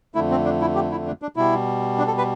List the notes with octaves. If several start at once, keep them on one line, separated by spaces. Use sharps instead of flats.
F2 D3 A3 E4
C4
D4
E4
G4
E4
D4
D4
B2 G3 E4
D4
A4
B4